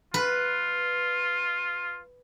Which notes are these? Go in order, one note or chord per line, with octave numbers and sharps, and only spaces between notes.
F4 B4